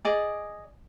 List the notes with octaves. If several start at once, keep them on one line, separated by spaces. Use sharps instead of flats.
G#4 D5 D#5